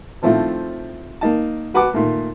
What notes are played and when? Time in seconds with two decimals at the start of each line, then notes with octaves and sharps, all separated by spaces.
0.22 D#3 F3 A3 C4 E4 F4
1.21 A#3 D#4 A5
1.74 F#4 B4 F#5 A5 D6
1.94 A#2 D#3 A3 A#3